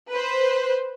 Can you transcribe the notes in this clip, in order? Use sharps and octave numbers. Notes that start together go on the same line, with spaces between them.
B4 C5